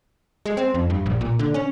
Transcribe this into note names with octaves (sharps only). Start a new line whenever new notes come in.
G#3
C4
F2
G2
A#1
A#2
D3
C#4